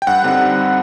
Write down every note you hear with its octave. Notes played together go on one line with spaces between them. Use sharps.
G5
G2 F#5
D3 G3 C4 D#4